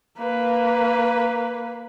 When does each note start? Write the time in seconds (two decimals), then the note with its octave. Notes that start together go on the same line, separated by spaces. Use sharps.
0.18 A#3 B4